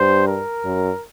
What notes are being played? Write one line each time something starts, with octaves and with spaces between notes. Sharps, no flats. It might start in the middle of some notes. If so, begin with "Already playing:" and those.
Already playing: G2 C5
A#4
F#2